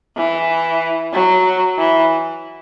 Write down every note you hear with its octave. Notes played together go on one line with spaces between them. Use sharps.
E3
F#3
E3